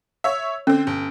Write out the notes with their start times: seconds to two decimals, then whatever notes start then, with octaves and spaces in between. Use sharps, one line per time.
0.24 C#5 E5
0.67 D3 C4 C#4
0.87 G1